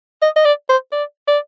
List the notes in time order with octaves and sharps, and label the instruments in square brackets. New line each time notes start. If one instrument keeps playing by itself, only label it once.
[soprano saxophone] D#5
D#5
D5
C5
D5
D5